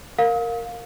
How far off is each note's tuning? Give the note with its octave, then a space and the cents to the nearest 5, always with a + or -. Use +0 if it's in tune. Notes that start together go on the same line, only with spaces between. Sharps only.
A#4 -10 F5 +20